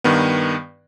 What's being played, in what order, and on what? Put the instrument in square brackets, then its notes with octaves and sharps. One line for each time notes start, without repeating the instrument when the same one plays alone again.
[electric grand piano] G2 D#3 B3